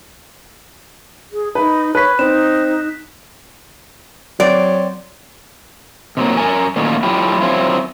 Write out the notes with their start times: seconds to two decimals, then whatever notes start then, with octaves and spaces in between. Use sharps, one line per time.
1.33 G#4
1.55 D#4 B4
1.95 B4 C#5 F#6 B6
2.19 C4 D#4 E7
4.40 F#3 C4 D5
6.17 C3 F#3 A#3
6.37 F#2 A#4 G#5
6.76 A#2 D#3 F#3 A3 C#4 F4
7.03 F#3 A3 D4 E4 F4 G4
7.41 F#3 C4 E4 F4